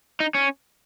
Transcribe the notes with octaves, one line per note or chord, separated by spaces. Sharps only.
D#4
C#4